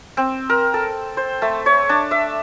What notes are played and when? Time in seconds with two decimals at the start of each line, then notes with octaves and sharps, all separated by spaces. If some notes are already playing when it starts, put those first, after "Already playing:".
0.17 C4
0.49 A#4
0.74 A4
1.17 C5
1.42 A3
1.66 C#5
1.89 D4
2.11 E5